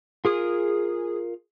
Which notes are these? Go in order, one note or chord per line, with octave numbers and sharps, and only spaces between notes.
F4 G#4 A#4 D#6